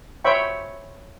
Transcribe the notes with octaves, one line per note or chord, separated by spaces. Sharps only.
C5 C#5 E5 G5 B5 C#6